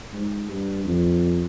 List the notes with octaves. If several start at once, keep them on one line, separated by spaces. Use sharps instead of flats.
G#2
G2
F2